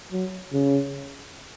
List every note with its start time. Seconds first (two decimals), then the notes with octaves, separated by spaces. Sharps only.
0.12 F#3
0.53 C#3